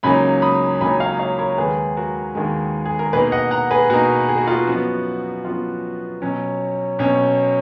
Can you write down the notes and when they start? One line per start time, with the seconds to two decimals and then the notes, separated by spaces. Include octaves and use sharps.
0.03 C#2 C#3 F#3 A#3 D#4 G#5 B5
0.42 B5 D#6
0.81 C#2 C#3 F#3 A#3 D#4 G#5 B5
1.00 C#5 F5
1.19 C#5 F5
1.39 A#4 C#5
1.58 D#2 D#3 G#3 G#4 B4
1.97 F#4 A#4
2.35 D#2 D#3 G#3
2.86 G#4
2.99 A#4
3.13 B2 A#3 D#4 G#4 B4
3.32 D#5 F#5
3.51 F#5 A#5
3.71 G#4 B4
3.90 B2 A#3 D#4 F#4 A#4
4.29 G#4
4.38 F#4
4.47 F4 G#4
4.67 F#2 F3 B3 F#4
5.45 F#2 F3 B3 F4
6.22 B2 F#3 C#4
6.99 B2 F#3 C#4